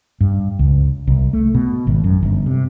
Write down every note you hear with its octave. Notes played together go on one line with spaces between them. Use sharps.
G2
C#2
C2
A3
B2
G#1
F#2
G1
C3